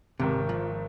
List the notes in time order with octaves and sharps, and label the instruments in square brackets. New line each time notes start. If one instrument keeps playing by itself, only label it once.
[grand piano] G#1 G#2 D#3 [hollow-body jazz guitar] C3
[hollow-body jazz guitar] F3